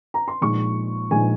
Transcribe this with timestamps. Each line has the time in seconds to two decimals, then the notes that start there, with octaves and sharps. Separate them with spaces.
0.14 A#5
0.28 C6
0.41 A#1 A#2 G#3 D#4 C#6
1.11 A#1 A#2 G#3 D#4 G#5